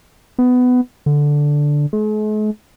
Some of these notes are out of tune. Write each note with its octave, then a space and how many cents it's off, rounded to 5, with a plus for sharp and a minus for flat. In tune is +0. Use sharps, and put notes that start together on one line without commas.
B3 +15
D3 -5
G#3 +45